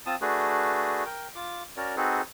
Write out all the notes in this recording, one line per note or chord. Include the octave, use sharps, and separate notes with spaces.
C4 F4 A5 D#6
A3 D4 F#4 G#4 B4
A#4 G5
F4 D6
C#4 F#4 A#4 C#5 D5
C4 D#4 F#4 G#4 A4 B4